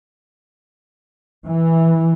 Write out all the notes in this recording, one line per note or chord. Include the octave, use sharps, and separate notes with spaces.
E3